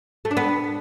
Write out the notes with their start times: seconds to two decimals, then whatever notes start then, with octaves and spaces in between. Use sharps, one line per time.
0.25 A3
0.31 D4
0.37 B3